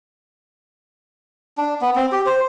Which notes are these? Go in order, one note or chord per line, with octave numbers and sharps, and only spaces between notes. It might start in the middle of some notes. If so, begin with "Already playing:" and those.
D4
B3
C4
G4
C5